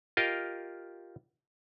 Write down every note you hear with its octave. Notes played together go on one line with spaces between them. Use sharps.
F4 G4 A#4 D#5 F5